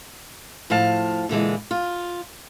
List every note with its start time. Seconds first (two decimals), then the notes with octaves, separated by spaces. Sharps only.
0.70 A2 F3 F5 A5
1.29 A#2 D3 E3 G#3
1.71 F4